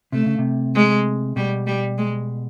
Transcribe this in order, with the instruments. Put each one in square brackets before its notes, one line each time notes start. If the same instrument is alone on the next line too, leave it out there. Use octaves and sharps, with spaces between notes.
[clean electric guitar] C3 [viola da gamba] A3
[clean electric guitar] C#3
C3
[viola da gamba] G#3
[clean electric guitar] B2 [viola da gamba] G3
[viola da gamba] G3
G#3